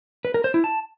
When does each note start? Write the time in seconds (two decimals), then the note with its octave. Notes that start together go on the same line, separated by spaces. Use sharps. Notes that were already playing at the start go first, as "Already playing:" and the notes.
0.25 B4
0.34 A#4
0.44 C5
0.54 E4
0.64 A5